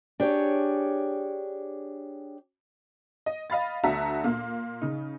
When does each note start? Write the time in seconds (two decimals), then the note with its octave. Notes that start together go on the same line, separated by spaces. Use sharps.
0.20 D4 G4 G#4 C#5
3.26 D#5
3.50 D#5 F5 B5 A6
3.83 D2 D4 F#4 E5 A5 A#5
4.24 A#2 A#3
4.82 C#3 D#4